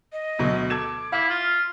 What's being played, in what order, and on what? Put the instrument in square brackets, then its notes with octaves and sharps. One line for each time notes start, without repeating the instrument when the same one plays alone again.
[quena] D#5
[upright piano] D2 B2 F#3
[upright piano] A4 G#6 E7 [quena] D6
[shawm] E4 [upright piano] F5
[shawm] F4 [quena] F6